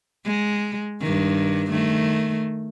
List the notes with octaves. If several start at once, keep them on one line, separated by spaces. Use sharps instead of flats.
G#3
G2 D#3
D#3 A3